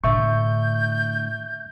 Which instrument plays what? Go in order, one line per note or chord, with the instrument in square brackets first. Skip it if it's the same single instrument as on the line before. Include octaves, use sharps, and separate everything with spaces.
[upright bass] A2 D3 [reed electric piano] E5 C#6 [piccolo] G6